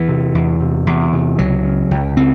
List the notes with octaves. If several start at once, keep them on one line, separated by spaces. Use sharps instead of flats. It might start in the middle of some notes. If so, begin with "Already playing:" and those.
Already playing: E2 E3
C3
E2
C3
E2
C3
C#2 F#3
C#3
C#2
C#3 C4